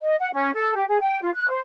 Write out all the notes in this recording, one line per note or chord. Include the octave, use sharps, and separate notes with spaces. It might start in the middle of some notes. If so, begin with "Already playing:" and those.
D#5
F#5
C#4
A4
G4
G#4
G5
F4
F#6
C5